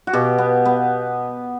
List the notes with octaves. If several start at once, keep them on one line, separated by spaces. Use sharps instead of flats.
F#4
B2 G4
B3
B3